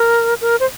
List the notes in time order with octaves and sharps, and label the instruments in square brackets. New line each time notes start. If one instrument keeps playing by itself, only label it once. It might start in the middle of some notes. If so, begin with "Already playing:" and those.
Already playing: [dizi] A#4
A#4
C5